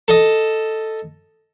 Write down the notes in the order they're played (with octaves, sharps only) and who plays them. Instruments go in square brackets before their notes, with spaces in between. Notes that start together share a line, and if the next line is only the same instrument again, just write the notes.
[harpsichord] A4 D#5